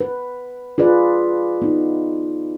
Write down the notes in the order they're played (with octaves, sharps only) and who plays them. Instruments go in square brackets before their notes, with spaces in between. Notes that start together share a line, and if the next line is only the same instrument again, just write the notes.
[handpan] B4
F4 G#4 B4 D5
B3 D#4